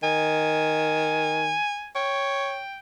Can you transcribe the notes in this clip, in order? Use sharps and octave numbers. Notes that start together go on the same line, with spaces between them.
D#3 G#5
C#5 G5